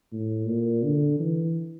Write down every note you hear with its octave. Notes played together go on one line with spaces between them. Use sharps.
A2
A#2
D3
E3